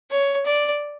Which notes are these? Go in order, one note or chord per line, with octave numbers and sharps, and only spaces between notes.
C#5
D5